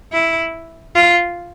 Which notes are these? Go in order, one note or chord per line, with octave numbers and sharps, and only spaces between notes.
E4
F4